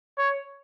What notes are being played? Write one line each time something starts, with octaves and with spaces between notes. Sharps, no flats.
C#5